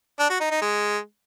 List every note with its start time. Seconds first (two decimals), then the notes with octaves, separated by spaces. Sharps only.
0.19 D4
0.30 F#4
0.40 D#4
0.51 D#4
0.61 G#3